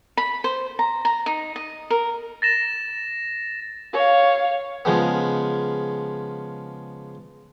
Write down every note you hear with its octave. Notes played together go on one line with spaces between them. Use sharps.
B5
C5
A#5
A#5
D#4
D#5
A#4
A6 A#6 E7
C#5 F5
C#3 F3 G#3 B3